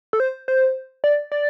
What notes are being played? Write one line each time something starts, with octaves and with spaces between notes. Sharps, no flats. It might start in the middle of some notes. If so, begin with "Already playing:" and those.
A4
C5
C5
D5
D5